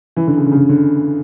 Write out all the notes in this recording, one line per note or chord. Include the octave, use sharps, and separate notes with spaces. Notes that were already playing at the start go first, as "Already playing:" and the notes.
E3
D3
C#3
D3
C#3
D3
D3